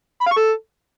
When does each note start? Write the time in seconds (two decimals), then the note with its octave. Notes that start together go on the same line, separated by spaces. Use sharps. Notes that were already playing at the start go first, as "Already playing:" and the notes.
0.21 B5
0.26 F5
0.31 C#6
0.37 A4